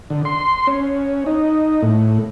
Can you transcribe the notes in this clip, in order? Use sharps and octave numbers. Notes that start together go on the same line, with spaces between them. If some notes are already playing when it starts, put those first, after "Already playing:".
D3
C6
C#4
D#4
A2